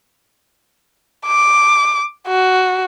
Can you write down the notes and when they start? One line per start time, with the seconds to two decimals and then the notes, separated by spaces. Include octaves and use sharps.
1.26 D6
2.27 F#4